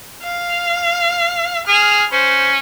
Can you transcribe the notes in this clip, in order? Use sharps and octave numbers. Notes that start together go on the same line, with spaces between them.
F5
G#4 F6
C#4 C5